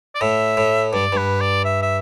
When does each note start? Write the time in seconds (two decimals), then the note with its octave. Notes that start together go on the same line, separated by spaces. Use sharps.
0.15 D5
0.21 A2 E5
0.57 A2
0.93 G2 D5
1.13 G2 B4
1.41 D5
1.65 E5
1.82 E5